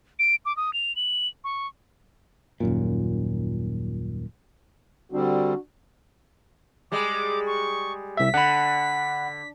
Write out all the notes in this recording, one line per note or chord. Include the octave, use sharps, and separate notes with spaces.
D7
D6
D#6
F7
F#7
C#6
D#1 F#2 A#2
D3 G3 C4 D4 F#4
G3 G#3 D6
C#6
C2 E5 B6
D3 F#5 B5